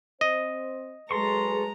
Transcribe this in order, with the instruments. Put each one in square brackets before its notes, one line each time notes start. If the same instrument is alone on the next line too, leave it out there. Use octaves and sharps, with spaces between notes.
[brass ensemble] C4 C5 [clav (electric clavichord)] D#5
[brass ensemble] F#3 G#4 B4 [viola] G#3 A#5 [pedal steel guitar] A4 C6 C#6